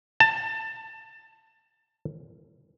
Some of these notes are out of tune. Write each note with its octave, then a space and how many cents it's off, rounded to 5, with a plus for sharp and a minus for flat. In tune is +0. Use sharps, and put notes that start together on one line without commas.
A5 +20